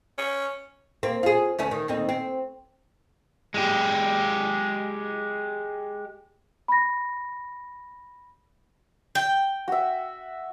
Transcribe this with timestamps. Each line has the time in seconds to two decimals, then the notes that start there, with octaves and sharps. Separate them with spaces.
0.18 C#4
1.03 A#3 C4
1.23 F4 G#4
1.59 D2 A3 C#4
1.71 D#3
1.88 D#2 C4 D#4
2.09 C4
3.54 G#3 G4
6.68 B5 A#6
9.15 G5
9.68 F#4 E5